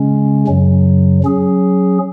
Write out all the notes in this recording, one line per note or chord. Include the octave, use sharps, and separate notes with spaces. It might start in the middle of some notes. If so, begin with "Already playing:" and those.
Already playing: C#3 G#3 C#4
F#2 C#3 F#3
F#3 C#4 G#4